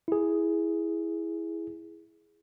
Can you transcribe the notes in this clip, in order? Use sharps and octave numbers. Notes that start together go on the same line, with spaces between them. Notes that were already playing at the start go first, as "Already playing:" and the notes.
E4 G#4